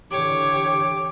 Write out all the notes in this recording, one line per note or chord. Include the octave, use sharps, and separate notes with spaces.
D3 E3 G4 C#5 D6